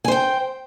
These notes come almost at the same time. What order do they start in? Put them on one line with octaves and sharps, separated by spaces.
G#5 C5 G5